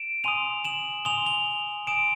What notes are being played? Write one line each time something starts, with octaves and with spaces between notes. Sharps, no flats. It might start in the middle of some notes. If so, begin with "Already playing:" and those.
Already playing: D7 E7
G#5 C6 D#6 D#7 F7
E7 F#7
G#5 C6 D#6 F7 G7
F7 G7
G#5 C6 D#6 D7 E7